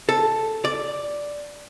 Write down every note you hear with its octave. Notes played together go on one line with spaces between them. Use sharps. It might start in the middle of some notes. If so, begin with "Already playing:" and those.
A4
D5